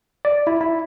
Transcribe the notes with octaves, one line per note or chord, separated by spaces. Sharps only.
D5
E4
E4